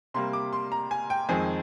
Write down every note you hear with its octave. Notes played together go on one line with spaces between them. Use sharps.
C3 G3 A#3 C6
D6
C6
A#5
G#5
G5
F2 D#3 G#3 C4 G#5